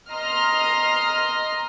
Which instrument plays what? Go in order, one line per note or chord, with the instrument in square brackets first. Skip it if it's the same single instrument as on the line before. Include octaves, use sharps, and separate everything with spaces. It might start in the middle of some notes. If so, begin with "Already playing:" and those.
[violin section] D#5 A#5 C6 D#6 F6 A#6